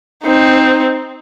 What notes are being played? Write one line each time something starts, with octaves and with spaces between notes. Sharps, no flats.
C4 D#4